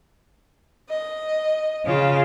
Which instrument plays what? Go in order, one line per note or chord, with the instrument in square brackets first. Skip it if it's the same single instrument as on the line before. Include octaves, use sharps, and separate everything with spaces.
[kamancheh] D#5
[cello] C#3 F4